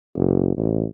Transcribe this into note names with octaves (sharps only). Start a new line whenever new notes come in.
F#1
A1